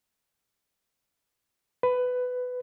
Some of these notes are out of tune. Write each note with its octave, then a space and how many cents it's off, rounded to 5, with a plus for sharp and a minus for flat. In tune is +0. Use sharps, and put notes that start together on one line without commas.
B4 +15